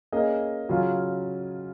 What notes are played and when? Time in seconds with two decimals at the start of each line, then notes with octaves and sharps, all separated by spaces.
0.12 A#3 C#4 G#4 D#5
0.69 C#3 F#3 C#4 F4